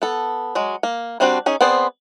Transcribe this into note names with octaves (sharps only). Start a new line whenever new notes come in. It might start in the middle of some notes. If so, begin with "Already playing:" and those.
B3 A4
F#3 G#3
A#3
G3 B3 C4 D4 F#4
C#4 D#4 G#4
B3 C4 G#4 C5 D5